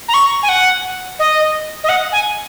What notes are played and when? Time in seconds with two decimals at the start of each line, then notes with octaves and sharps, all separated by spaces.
0.08 A#5
0.14 C#6
0.43 G#5
0.49 F#5
1.19 D#5
1.84 D#5
1.89 F#5
2.12 G#5